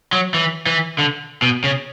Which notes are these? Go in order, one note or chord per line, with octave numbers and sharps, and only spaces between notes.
F#3
E3
E3
D3
B2
C#3